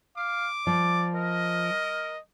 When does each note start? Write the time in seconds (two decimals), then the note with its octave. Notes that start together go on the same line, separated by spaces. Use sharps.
0.17 F5 D6
0.67 F3 D5
1.14 A#4 D#5